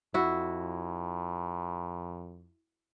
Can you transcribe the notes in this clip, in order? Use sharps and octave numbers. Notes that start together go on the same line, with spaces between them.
F2 E4 F#4